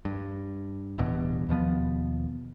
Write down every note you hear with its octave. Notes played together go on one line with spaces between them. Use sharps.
G2
D1 E2 G2 B2
D#2 B2 F3 B3